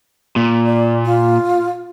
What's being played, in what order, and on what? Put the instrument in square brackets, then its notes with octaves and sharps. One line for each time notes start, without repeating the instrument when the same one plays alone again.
[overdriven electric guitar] A#2
[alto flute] D5
F4